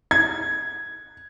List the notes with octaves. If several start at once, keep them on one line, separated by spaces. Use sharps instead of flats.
G#6